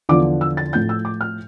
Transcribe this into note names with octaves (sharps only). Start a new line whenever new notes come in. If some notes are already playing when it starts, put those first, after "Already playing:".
E2 D3 F3 D6
E6
A6
A2 F3 G6
E6
D6
F6